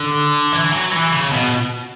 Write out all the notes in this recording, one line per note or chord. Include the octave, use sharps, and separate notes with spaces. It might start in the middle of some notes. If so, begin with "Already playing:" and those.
Already playing: D3
E3
F#3
E3
C#3
B2